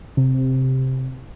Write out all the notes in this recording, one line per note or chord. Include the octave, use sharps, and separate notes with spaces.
C3